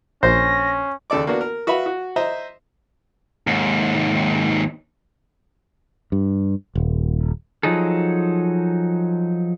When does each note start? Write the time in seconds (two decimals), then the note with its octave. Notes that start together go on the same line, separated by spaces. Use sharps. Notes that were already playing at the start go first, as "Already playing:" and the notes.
0.23 A#1 C#4 C5 A#6
1.10 D#2 C#3 A4 D5 D6
1.27 A#3 B3 D4 F#4
1.41 A#4
1.67 F#4 B4 E5 F5 B5
1.86 F#4
2.16 C5 D#5 E5 A#5
3.47 D#2 G#2
6.12 G2
6.75 D#1
7.63 F3 F#3 D#4 G#4 A4